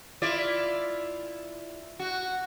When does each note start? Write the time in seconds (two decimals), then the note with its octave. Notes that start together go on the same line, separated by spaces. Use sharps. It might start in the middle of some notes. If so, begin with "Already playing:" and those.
0.22 E4 F4 D5
2.00 F#4